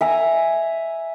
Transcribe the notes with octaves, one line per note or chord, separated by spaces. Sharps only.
E5 G#5 A#5